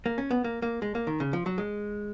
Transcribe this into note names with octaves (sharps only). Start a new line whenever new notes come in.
A#3
C#4
B3
A#3
A#3
G#3
A#3
D#3
C#3
F3
F#3
G#3